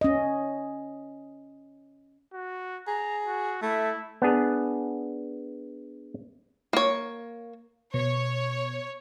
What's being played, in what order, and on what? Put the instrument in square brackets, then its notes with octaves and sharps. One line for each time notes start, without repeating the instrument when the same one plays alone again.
[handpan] C#4 D#5
[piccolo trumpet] F#4
[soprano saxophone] G#4 [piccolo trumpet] A#5
[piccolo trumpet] F#4
[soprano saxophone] A3 [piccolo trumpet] E4
[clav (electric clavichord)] B3 D4 G#4
[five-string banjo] A#3 C#5
[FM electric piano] B2 [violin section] C#5